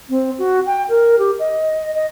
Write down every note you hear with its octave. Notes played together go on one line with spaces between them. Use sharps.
C4
F#4
G5
A#4
G4
D#5
D#5